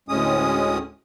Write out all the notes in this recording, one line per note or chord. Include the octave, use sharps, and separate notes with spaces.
D2 A2 G#3 C#4 D#6